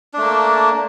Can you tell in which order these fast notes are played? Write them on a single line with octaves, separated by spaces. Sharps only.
D4 A3 A#3